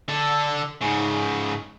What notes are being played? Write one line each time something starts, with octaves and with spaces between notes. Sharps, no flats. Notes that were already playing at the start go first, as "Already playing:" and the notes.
D3 A4
G#2 C#3